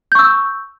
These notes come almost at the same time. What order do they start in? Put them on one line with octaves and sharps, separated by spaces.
G6 C#6 E6